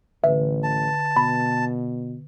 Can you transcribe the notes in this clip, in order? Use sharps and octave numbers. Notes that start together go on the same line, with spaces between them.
A1 D3 B4 E5
A5
B2 B5